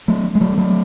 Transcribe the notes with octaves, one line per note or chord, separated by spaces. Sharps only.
F#3 A3
G#3
F#3 A3
F#3 A3